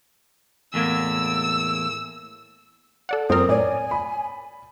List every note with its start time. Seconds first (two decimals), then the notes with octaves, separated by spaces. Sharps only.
0.74 E2 A2 A#3 E6
3.09 A4 D5 F#5
3.30 F#2 C4 A#4 D#6
3.49 A2 C#5 D5 G#5
3.91 B5